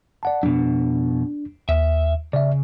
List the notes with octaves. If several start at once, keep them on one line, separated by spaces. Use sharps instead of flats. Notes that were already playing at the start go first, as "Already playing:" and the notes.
D5 F#5 A5
F2 B2 D4
D#2 E5
C#3 D5 E5